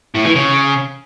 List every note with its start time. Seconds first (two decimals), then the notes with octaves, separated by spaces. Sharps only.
0.14 A2
0.25 E3
0.35 C#3